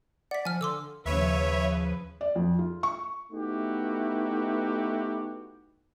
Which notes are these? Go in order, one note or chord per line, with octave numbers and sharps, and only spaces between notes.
D5 F#5 B6
F3 G#5 F6
D3 C6 D6 E6
D#2 C#3 F3 B4 C#5 E5
D5
F2
F4
C#6
A3 B3 D#4 E4 F#4 G4